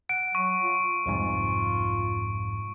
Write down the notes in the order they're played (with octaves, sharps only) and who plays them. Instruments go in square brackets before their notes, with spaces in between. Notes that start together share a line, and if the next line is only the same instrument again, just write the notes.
[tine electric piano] F#5 [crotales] D7
[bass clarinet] F#3 [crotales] C#6
[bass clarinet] F4
[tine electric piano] C2 F2 G#2